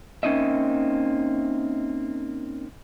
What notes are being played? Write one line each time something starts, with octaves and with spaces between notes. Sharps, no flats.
A#3 C4 C#4 D#4 D#5 E5